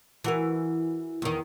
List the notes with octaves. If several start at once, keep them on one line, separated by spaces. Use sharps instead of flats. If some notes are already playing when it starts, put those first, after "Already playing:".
E3 F#4 A#4
E2 D#3